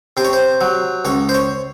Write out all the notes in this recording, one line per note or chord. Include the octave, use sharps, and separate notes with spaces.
C3 C5
C#5
C5
F#3
C#2 C#5
C5
C#5